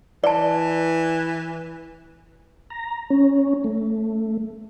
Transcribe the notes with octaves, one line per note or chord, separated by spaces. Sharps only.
E3 D5 A5
A#5
C#4
A3